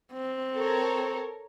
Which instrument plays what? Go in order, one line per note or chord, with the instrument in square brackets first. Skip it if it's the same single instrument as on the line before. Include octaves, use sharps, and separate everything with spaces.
[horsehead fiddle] C4
[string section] A4 A#4 C#5